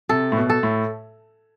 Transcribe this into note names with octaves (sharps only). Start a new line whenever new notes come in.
C3 A4
A2
B2
A4
A2